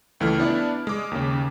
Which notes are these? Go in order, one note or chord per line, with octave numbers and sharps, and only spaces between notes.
C#2 E3 A3 F6
B3 D4 E4 D5
G#3 D6
D#2 C#3